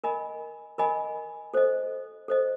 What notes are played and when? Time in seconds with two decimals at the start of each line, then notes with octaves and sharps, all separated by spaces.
0.04 A#4 D#5 G#5 B5
0.78 A#4 D#5 G#5 B5
1.54 A4 C5 D#5
2.28 A4 C5 D#5